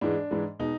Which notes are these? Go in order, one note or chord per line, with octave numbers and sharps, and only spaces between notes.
G#2 E3 G#3 D4
G#2 E3 G#3
B2 G#3 D#4